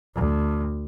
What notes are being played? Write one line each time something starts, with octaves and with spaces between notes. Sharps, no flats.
D2